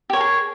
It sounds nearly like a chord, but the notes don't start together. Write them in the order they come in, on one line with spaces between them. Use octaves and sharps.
G4 C#5 A#4 G#4